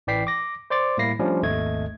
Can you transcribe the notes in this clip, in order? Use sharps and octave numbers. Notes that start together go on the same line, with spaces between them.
A1 E3 D5 G5 B6 C7
D6 A#6
C5 D5 C6 D6 A6
A2 G3 A#3 E4 A#6 C7
F3 G3 A3 C#4 D4
G#1 D#2 A3 D#5 G#6